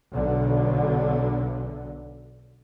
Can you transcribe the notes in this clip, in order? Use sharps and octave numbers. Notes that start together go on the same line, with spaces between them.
B1 D3